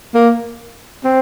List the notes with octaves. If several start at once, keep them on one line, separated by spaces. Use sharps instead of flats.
A#3
C4